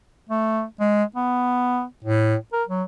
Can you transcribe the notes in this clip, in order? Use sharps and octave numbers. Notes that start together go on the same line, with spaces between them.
A3
G#3
B3
A2
A#4
F#3